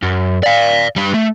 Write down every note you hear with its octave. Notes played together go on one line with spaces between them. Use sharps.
F#2
D5 F5
G3 B4
A3